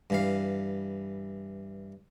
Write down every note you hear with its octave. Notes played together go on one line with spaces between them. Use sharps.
G2 E3 F5